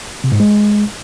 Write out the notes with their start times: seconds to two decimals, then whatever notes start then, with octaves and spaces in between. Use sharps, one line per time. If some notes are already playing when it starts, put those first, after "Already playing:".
0.24 C3
0.32 G#2
0.40 G#3